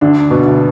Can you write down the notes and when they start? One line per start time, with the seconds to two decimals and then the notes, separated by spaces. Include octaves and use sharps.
0.01 D2 D3 D4
0.31 B2 B3
0.46 D2